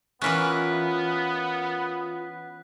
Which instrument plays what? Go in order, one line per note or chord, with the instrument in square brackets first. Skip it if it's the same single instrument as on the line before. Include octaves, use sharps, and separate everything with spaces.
[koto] E3 C#4 [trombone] B3 [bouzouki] F4 A#4 B4 [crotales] F#6 B6